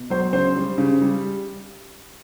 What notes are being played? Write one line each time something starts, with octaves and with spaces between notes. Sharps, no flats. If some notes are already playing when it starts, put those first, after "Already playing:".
Already playing: B2
F#3 C5
C#3 C5
G3
C#3
G3